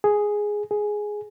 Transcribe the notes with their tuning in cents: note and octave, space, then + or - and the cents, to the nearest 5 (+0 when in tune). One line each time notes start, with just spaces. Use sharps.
G#4 +0
G#4 +5